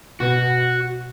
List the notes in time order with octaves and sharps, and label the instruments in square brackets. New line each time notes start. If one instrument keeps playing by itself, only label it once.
[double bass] B2 [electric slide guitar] F#4